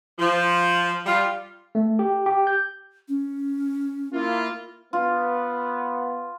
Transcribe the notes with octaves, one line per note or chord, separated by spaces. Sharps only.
F3
G3 F4
A3
G4
G4
G6
C#4
A#3 E4 F4
B3 F4